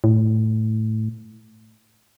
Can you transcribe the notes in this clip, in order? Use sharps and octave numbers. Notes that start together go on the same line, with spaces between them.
A2